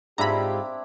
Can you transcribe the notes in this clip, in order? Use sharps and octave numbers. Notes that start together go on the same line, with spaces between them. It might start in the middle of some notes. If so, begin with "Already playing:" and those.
G#2 C4 D4 E4 F4 G4 A#5 B5